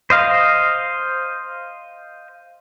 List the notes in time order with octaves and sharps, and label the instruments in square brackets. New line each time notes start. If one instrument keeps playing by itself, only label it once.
[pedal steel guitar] C5 D#5 F5